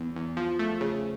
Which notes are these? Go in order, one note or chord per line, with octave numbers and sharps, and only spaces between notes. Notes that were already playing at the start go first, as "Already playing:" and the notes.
Already playing: E2
E2
F3
A3
C#3